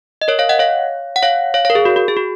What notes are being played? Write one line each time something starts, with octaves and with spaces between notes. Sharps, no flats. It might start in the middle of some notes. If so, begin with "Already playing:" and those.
D#5
A#4 C#5
C#5 F5
D#5 F#5
C#5 F5
F#5
C#5 F5
C#5 F5
C#5 F5
A#4
G#4
F#4
F#4
G#4
F#4